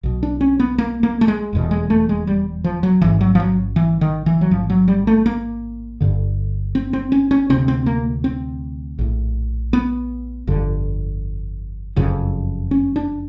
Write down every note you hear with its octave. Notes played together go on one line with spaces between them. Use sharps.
B1 B2
D4
C#4
B3
A#3
A#3
A3
G#3
F1 E2 B2
G#3
A3
G#3
G3
F3
F#3
A1 G#2 E3
F#3
F3
F#3
E3
D#3
E3
F#3
A1 G#2 F3
F#3
G3
A3
A#3
G1 G2 D3
C4
C4
C#4
C#4
D2 C3 C4
C4
A#3
C4
A#1 A2
B3
G1 F2 D3
F#1 F2 C#3
C#4
D4